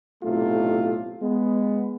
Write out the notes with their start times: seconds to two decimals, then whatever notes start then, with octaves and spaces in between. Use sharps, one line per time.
0.23 B1 A2 C3 A3 F4
1.21 G#3 B3